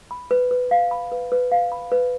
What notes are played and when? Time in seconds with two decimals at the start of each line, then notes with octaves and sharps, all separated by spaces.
0.11 B5
0.31 B4
0.51 B4
0.71 F5
0.91 B5
1.12 B4
1.32 B4
1.52 F5
1.72 B5
1.92 B4